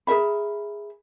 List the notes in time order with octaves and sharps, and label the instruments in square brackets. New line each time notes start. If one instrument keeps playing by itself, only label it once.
[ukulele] G#4 A#4 E5 B5